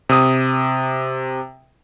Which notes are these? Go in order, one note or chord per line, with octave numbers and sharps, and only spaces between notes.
C3 D#6